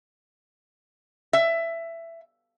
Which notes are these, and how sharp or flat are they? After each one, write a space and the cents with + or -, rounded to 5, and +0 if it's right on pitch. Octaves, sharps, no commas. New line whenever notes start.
E5 +15